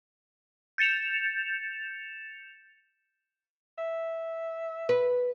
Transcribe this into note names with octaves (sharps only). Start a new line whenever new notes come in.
G6 A6 C#7 E7 F7
E5
B4